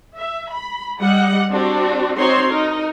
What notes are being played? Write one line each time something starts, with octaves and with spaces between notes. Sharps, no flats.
E5
B5
G3 G4 D#5 F#5
C4 D4 F#4 G4
C4 D#4 F#4 C5 C#5 C6
D#4 A#4